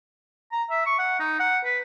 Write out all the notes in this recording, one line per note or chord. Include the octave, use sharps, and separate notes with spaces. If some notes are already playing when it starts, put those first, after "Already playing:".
A#5
E5
C#6
F#5
D#4
F#5
B4